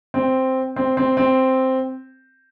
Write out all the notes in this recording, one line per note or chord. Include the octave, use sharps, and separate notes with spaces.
C4
C4
C4
C4